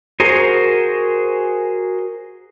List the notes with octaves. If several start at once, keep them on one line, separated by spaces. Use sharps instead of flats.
F#4 G#4 A#4 C5